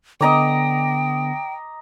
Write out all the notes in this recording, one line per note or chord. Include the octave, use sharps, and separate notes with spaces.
D3 B3 D#5 G5 A#5 D6